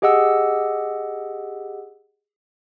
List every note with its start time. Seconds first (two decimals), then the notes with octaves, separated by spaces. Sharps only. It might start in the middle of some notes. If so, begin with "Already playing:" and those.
0.02 G4 G#4 D#5 F#5 E6